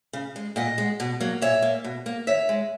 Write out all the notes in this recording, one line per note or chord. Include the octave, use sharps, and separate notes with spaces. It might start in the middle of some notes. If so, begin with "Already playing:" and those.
C#3
G#3
A#2 D#5 F#5
G#3
B2
F#3 A#3
A#2 C#5 E5
A#3
B2
A#3
D#3 C#5 E5
G#3